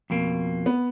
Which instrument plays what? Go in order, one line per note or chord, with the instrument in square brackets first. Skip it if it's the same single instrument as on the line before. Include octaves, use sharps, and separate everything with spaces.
[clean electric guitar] F2 B2 A#3
[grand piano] B3